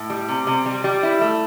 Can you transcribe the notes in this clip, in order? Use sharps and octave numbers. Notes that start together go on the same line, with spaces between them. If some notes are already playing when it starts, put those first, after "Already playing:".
Already playing: A2
G3
C3
C3
G3
G3
E4
A3